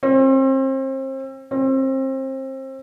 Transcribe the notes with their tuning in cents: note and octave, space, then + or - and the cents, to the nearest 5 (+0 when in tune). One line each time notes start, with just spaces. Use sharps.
C4 +35
C4 +30